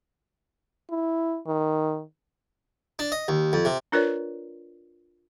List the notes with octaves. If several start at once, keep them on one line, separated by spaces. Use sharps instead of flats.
E4
D#3
D4
D#5
D#2
F2
C3
D4 F4 A#4 B4 C#5 D5